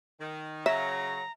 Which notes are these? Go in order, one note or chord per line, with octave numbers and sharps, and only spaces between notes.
D#3
C#3 F#3 E5 A#5